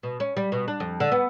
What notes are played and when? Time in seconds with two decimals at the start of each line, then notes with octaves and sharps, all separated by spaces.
0.03 B2
0.20 C#4
0.37 G3
0.52 B2
0.68 D4
0.80 F2
1.00 D3
1.12 B3